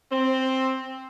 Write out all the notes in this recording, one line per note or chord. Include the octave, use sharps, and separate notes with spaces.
C4